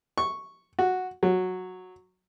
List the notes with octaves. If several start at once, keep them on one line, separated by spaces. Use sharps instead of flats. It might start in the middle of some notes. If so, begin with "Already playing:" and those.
C#6
F#4
F#3